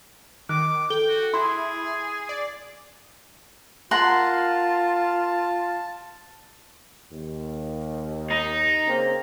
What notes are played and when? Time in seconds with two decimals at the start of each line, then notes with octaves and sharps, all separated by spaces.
0.49 D#3 D6 F#6
0.90 A4 G5 G7
1.08 F#4
1.34 E4 G#4 C6
2.29 D5
3.91 F4 A#4 F#5 A5 C6
7.12 D#2
8.31 D#4
8.85 C#3 A#3 C4